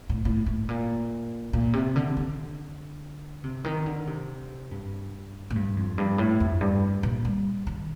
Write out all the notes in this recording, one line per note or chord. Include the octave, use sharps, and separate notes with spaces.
A2
A2
A2
A#2
A#2
C3
D3
D3
C3
D#3
D3
C3
G2
A2
G2
F2
G2
A2
F2
G2
A#2
G3
D#3